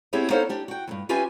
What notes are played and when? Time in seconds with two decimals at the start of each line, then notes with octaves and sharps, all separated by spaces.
0.13 B3 C4 E4 G4 G#4 C#5
0.30 B3 D#4 A4 C5 C#5 F5
0.49 D4 G4
0.68 F#4 G5
0.87 E2 G2
1.09 C#4 F4 G4 B4 E5 G#5